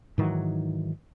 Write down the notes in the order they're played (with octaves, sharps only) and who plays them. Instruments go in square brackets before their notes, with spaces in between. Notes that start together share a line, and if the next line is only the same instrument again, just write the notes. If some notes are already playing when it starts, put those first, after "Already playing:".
[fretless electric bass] G#2 D#3 E3 F#3